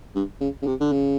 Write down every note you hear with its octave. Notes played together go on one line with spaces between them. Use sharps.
G2
C#3
C#3
C3
D3
C#3